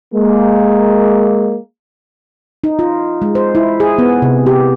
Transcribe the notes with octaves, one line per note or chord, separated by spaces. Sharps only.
G#3 A#3
D#4
F4
G#3
C5
E4
G#4
B3
C3
G4